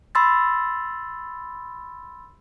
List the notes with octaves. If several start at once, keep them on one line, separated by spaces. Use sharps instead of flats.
B5 C6 E6 A6